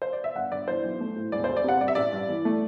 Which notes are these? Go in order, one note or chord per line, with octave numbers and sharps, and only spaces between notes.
C5
D5
E5
G1 F#5
G1 D5
E3 C5
B1
A3
A2
E1 D5
D2 C5
D5
C3 F#5
G2 D5
E5
A1 D5
G2
E3
A3